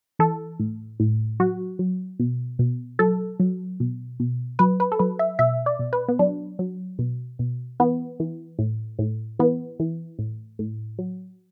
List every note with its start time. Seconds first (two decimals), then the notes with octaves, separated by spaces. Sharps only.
0.19 E3 A4
0.59 A2
1.00 A2
1.40 F#3 F#4
1.79 F#3
2.19 B2
2.59 B2
2.99 F#3 A4
3.40 F#3
3.80 B2
4.20 B2
4.59 F#3 B4
4.80 B4
4.92 A4
4.99 F#3 B4
5.19 E5
5.39 B2 E5
5.66 D5
5.79 B2
5.93 B4
6.08 B3
6.19 F#3 D4
6.59 F#3
6.99 B2
7.39 B2
7.80 E3 B3
8.20 E3
8.59 A2
8.99 A2
9.39 E3 B3
9.80 E3
10.19 A2
10.59 A2
10.99 F#3